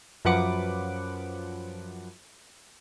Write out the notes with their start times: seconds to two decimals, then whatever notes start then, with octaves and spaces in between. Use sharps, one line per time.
0.25 F#2 F3 B4 F#5 D6